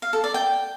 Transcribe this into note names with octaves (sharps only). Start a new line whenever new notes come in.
F5
A4
D5
G5